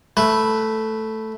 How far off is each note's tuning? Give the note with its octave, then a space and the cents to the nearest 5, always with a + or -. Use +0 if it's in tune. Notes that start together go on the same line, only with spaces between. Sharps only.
A3 +0 B4 +0